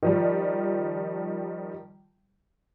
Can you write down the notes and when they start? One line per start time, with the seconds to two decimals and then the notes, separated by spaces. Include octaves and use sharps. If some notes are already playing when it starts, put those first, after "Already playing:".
0.03 D#3 F3 G3